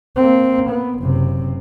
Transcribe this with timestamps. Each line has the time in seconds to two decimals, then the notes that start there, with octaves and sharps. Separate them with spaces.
0.16 A#3 C4
0.70 B3
1.00 F#1 C3